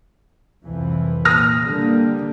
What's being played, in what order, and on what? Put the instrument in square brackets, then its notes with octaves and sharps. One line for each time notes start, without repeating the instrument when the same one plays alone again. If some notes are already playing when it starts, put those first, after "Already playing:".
[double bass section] C2 F2 E3
[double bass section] A#2 [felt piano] D#6 F6 A#6
[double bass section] D3 G3 A#3